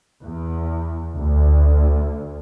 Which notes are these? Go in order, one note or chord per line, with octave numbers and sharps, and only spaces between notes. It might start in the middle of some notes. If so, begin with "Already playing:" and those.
E2
D2